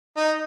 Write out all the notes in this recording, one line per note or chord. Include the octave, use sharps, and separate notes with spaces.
D#4